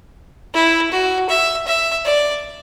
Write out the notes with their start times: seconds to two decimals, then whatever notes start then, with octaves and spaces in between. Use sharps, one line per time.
0.54 E4
0.92 F#4
1.29 E5
1.67 E5
2.05 D5